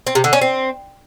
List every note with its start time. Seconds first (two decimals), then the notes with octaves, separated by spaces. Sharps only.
0.07 C4
0.15 C3
0.24 D3
0.33 C#4
0.41 C4